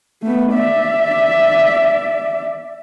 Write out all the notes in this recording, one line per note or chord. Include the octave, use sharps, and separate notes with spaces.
A3 B3
D5 E5